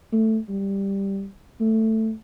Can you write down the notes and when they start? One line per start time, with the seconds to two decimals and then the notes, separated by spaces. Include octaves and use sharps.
0.12 A3
0.49 G3
1.60 A3